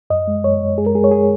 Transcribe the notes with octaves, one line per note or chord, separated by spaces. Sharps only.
F#2 D#5
G#3
F#2 C#5
F#2
G#3 G#4
A#4
G#3 G#4
C#5
G#4